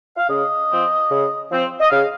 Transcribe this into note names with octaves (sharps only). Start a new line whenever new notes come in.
F5
C#3 D#5
F3 C4
C#3
F3 C4
D#5
C#3 F5